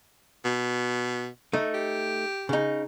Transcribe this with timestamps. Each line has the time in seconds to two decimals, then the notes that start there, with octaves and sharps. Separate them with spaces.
0.44 B2
1.53 A3 D#4
1.74 G4
2.49 C#3 D#4